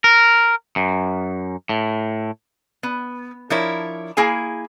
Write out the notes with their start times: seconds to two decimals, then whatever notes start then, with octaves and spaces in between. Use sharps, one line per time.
0.04 A#4
0.76 F#2
1.69 A2
2.83 B3
3.50 F3 D4 E4 A#4 C#5
4.17 A#3 E4 G#4 G#5